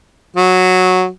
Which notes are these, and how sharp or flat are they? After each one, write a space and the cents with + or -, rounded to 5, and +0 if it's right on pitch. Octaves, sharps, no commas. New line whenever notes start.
F#3 -10